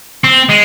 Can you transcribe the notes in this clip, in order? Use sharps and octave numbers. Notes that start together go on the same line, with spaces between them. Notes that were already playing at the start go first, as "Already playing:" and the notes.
C4
G#3